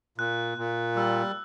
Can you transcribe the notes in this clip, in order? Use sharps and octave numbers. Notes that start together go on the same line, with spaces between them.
A#2 F#6
A#2
G3 E6